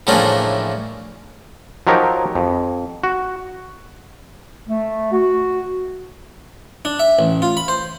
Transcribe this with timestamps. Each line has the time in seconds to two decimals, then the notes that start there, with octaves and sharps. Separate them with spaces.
0.07 A2 C#3 E3 F3 A#3 D4
1.87 F3 F#3 D#4 G4 A#4 C#5
2.35 F2
3.04 F#4
4.67 A3
5.12 F#4
6.85 D4
6.99 E5
7.19 A1
7.42 F4
7.57 B5
7.68 C5